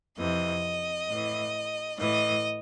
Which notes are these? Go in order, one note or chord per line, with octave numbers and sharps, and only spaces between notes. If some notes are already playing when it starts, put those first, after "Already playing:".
F2 C3 E3 D#5
A2 E3
A2 E3 D#5